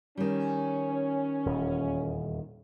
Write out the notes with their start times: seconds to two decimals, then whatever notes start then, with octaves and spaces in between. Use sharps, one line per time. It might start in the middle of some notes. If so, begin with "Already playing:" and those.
0.17 D#3 G3 C#4
1.46 D#1 E2